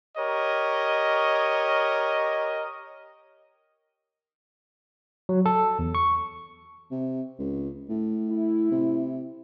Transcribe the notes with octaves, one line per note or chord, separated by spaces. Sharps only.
G4 A#4 C#5 D#5
F#3
A4
E2
C#6
C3
C#2
A2
E4
C3